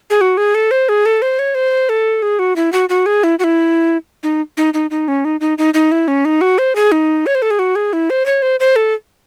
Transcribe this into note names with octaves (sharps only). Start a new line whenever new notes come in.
G#4
F#4
G#4
A4
C5
G#4
A4
C5
C#5
C5
A4
G#4
F#4
E4
F#4
F#4
G#4
E4
F#4
E4
D#4
D#4
D#4
D#4
C#4
D#4
D#4
D#4
D#4
E4
C#4
D#4
F#4
C5
G#4
D#4
C#5
C5
A4
G#4
F#4
G#4
E4
C5
C#5
C5
C5
A4